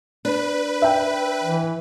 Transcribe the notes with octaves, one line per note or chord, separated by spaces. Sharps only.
D4 B4
E5 G5
E3